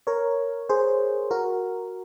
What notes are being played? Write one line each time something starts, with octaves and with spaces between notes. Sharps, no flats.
A#4 C#5
G#4 C5
F#4 A#4